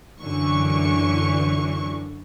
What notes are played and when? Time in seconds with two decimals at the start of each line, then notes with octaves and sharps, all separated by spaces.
0.20 F#2 D3 E3 C#6